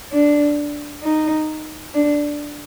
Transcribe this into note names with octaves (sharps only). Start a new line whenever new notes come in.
D4
D#4
D4